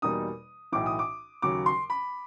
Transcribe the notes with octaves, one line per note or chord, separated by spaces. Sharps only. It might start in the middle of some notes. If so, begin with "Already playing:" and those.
E2 B2 G3 A#3 D#4 D#6
B1 A2 E3 D6
D#6
D6
D#2 C#3 F#3 D6
C6
B5